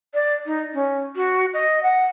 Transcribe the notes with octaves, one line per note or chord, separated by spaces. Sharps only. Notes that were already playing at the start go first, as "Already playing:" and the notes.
D5
D#4
C#4
F#4
D#5
F#5